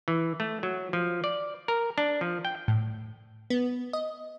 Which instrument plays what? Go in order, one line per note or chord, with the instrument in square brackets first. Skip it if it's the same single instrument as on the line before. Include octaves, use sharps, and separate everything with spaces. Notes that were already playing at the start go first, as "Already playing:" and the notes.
[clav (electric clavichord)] E3
A3
F#3
F3
D5
A#4
D4
F3
G5
[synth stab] A2
B3
D#5